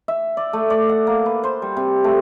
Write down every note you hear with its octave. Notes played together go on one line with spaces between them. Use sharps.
E5
D5
A3
D5
F#5
A#3
B4
C5
G3
C3
A3